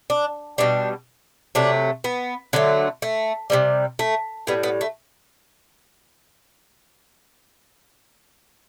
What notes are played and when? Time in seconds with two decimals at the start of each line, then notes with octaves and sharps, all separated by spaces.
0.10 D4
0.58 B2 G3 D4
1.55 C3 F#3 A3 D4
2.04 B3
2.53 D3 F#3 A3
3.02 A3
3.50 C3 E3 G3
3.99 A3
4.47 A2 G3 B3
4.63 B3
4.81 A3